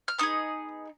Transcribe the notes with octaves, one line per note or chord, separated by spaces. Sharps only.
F6
B3 D#4 G#4 D#6